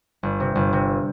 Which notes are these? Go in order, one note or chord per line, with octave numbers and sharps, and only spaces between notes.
G1
C3
G1
C3